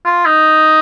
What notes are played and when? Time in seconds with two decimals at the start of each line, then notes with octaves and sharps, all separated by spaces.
0.05 F4
0.26 D#4